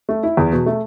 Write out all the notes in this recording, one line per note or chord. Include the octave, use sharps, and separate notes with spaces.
A3
E4
E2
B2
A3